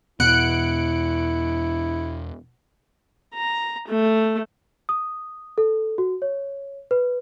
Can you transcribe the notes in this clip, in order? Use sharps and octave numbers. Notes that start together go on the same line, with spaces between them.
E2 B2 B3 E4 F#5 F#6 C#7 D7
A#5
A3
D#6
A4
F#4
C#5
B4